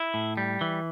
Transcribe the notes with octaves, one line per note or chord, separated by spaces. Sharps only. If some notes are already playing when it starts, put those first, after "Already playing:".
Already playing: E4
A2
G3
E3